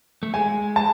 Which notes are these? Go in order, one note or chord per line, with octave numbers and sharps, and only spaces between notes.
A3
G#3 G#5
A5